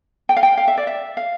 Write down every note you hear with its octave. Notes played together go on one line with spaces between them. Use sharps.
G5
F5
G5
F5
E5
D5
E5
F5